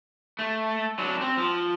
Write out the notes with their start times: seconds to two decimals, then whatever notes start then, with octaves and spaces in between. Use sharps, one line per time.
0.39 A3
0.99 F#3 D4
1.21 C4
1.37 F3